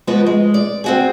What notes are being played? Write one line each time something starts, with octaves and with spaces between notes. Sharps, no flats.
F3 G#3 B3 F#4 B4
G#3
D5
C4 F#4 G#4